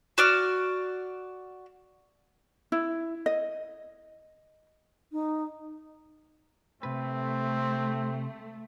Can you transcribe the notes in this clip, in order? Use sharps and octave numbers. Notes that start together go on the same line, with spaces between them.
F#4 D5 F6
E4
D#5
D#4
C3 A3 C4 B4